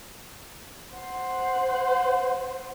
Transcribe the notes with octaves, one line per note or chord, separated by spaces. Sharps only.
C5 F#5